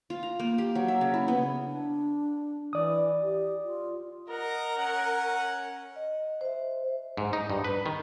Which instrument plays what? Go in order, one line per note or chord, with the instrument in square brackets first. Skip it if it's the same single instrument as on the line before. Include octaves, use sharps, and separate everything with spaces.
[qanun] F4
A#5
A#3
G4
F#3
E5
C#3
E4
B3
[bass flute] D4
[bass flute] E3 [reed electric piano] D5 D#6
[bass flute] G4
F4
[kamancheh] A#4 [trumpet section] D#5 F#5 A#5
[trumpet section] C#4 F#5
[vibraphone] D#5
C5 E5
[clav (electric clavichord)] G#2
D#4
G2
B4
D#3